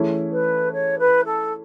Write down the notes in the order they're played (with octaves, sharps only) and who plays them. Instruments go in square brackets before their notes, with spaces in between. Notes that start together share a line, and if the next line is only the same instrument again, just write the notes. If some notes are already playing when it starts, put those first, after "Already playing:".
Already playing: [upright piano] E3 A3 C#4 E4 G#4
[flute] B4
C#5
B4
A4